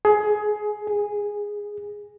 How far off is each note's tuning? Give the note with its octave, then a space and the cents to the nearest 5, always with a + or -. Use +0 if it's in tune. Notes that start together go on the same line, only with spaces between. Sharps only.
G#4 +20
G#4 -10